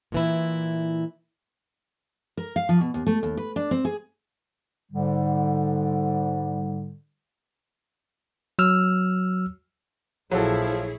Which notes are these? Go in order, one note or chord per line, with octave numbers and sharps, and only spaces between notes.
A#2 E3 E4
A#4
F5
F3
B2
D#2
A3
D#2
B4
D4
C4
G#4
G#2 D3 G3
F#3 E6 F6
A#1 F3 F#3 E4 G#4 A4 C#5